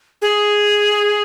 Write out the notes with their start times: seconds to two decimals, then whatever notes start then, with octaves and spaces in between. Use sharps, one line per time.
0.22 G#4